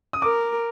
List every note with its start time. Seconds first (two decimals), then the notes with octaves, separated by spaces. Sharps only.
0.13 D#6
0.22 A#4 D6